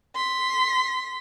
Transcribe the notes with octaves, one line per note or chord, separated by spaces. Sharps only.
C6 B6